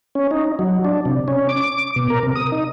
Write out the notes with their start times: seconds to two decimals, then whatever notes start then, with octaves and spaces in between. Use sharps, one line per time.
0.15 C#4
0.31 D#4
0.59 F#3
0.85 D4
1.05 C3
1.28 C#4
1.49 D6
1.96 B2
2.10 A#4
2.23 C3
2.35 D#6
2.52 D#4